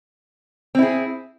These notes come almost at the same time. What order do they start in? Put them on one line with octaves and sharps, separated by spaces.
C4 E4 G#4